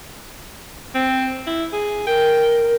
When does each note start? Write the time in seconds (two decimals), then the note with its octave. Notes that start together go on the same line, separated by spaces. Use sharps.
0.95 C4
1.47 E4
1.73 G#4
2.07 A#4 G5